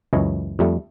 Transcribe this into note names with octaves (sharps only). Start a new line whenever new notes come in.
C#2 F#2 E3 C#5 D#5
F2 G3 A3